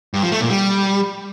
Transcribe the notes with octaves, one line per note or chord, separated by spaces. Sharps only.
G2
F3
A3
A#2
G3